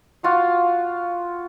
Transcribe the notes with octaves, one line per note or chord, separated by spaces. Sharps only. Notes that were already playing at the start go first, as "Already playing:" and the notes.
F4 F#4 F5